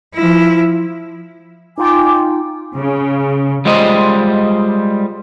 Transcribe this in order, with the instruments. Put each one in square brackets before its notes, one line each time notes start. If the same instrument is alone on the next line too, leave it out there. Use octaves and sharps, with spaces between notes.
[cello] F3 E4
[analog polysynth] D#4 F4 G5 [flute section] G#5 D6
[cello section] C#3
[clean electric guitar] G3 G#3 F4 C5 D#5